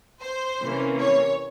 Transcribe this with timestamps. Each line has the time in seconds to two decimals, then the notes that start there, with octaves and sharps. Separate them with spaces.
0.20 C5
0.60 C3 E3 A#3 C#4
1.00 C#5